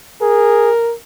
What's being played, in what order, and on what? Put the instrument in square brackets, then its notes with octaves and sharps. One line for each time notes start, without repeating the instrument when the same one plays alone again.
[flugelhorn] G#4 [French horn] A#4